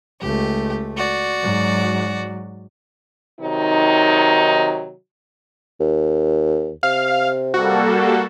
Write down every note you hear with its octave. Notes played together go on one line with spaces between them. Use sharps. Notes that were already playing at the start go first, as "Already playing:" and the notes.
C#2 A3 G4
F#4 D5
G#2 F#3
C3 D#3 F#3 D#4
D#2
C3 F5
G3 A#3 F#4 A4